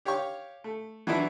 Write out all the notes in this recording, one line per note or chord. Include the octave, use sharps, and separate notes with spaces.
G4 C#5 F5 G5 C#6
A3
E3 F#3 B3 D4 E4